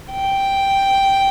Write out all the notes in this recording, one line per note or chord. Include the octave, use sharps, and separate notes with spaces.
G5